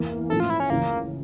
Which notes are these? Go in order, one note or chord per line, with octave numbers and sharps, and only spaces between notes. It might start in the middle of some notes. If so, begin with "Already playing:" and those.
Already playing: E2 E3 A#3
A2 F3 C#4 E4 A4
F4
E4
C#4
C#2 C#3 E3 A#3